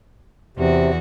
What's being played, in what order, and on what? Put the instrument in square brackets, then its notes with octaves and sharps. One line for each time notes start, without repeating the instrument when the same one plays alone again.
[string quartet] E2 F#4 [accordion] C3